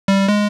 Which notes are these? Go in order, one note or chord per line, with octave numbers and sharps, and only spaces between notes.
G3
G#3